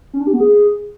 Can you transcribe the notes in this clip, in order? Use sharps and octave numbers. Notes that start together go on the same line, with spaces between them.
C#4
D4
G4
B3
G#4